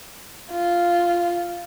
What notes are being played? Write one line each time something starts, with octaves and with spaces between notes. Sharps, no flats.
F4